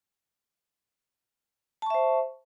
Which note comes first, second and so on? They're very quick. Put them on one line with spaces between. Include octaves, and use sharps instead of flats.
A5 C#6 E5 C5